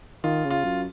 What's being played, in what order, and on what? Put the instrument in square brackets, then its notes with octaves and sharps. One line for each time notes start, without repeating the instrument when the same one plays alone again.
[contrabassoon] D#3 [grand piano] F4
[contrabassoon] C#3
[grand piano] F4
[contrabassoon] F#2